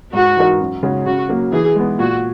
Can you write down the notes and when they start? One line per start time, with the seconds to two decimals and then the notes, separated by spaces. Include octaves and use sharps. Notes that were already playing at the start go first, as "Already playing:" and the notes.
0.13 G#2 F#4
0.37 E3 G#3 D#4 A#4
0.60 F#2
0.83 C#3 G#3 C#4 F#4
1.06 C#3 F#4
1.29 F#3 A#3
1.52 E3 G#4
1.75 G#3 B3
1.99 A#2 F#4